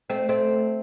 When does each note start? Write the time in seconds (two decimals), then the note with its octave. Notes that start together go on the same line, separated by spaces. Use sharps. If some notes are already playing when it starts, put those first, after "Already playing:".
0.10 A3 C4
0.29 A3 C4